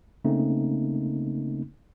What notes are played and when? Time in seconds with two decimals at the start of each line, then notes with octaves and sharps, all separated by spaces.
0.24 C#3 A3 A#3 C4 C#4 D#4